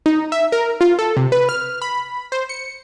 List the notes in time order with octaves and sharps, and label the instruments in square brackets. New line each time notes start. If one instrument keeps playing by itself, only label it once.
[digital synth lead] D#4
E5
A#4
F4
A4
C3
B4
F6
B5
C5
C#7